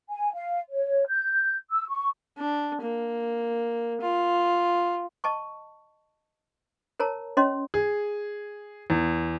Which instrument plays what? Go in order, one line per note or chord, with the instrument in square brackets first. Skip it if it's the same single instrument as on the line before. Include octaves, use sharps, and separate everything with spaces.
[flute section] G#5
F5
C#5
G6
E6
C#6
[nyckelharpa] D4
A#3
F4
[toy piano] D#5 A5 C#6
A#4 C#5 A5 A#5
C#4 C#5 D#5 C6
[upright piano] G#4
E2